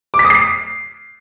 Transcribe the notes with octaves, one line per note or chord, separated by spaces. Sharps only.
D6
B6
D#6
C7